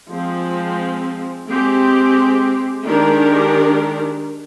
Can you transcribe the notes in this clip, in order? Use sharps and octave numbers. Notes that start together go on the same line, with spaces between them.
F3 G#3 C4
G#3 C4 G4
D#3 G#3 D4 G4 A#4